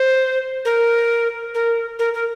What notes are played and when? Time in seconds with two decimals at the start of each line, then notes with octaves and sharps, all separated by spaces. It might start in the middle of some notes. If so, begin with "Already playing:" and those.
Already playing: C5
0.65 A#4
1.54 A#4
1.99 A#4
2.14 A#4